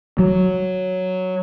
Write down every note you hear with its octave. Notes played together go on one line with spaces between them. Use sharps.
F#3